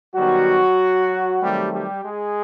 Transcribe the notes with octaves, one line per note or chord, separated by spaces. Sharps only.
D#3 F#3 G3 B3 F#4
D#3 F#3 G3 A3 C4 G4
G3 G4
G#3 G#4